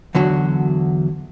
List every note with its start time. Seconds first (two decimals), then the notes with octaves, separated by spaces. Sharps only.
0.15 E2 D3 F#3 F#4